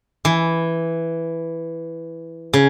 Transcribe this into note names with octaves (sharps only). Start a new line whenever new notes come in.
E3
C#3